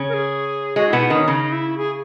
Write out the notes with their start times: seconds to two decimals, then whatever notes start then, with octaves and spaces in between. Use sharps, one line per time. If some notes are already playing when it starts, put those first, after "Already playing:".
Already playing: C#3 C#4
0.09 A#4
0.14 G#4
0.76 G#3 F#4
0.89 B2 B3 E4
1.02 D#4
1.10 D#3 C#4
1.27 C#3 D#4
1.52 E4
1.78 G#4